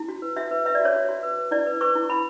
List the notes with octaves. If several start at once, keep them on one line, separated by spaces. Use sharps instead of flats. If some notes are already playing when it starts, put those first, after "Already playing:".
Already playing: E4
F#4
B4
F#4 E5
B4
B4 E5
D5
F#4
C#5
F#4
F#4
B4
B4
E4 D5
B4
B4 C#6
E4
E4 B5